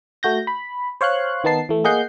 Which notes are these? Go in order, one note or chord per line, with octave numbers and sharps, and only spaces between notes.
A3 F#4 G6 A#6
B5
C5 C#5 F5 C6 F#6
D#3 B3 D#4 A5 C7
E3 A3
A#3 G#4 D#5 F#5 G6 C7